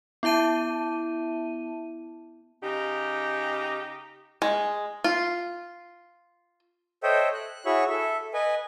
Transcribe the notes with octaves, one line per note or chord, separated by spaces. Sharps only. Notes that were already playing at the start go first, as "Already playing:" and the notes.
B3 E4 E5 A5 D#7
C#3 D#4 G4
G#3
F4
A4 C5 C#5 D#5 E5 G5
F#6
E4 F#4 G#4 C#5 E5 C#6
A4 E5
B4 D#5 G#5